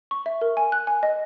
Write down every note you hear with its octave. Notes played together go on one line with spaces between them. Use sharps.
C#6
E5
A#4
G#5
F#6
G#5
D#5